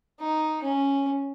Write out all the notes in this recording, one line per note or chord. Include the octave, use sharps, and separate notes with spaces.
D#4
C#4